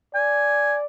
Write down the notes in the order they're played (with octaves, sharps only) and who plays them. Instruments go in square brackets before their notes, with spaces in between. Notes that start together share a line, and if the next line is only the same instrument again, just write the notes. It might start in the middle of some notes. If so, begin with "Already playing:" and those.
[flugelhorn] D5 [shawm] G#5